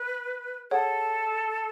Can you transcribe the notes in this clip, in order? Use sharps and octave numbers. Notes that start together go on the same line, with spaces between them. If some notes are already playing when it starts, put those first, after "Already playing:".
Already playing: B4
G#4 A4 C#5 F#5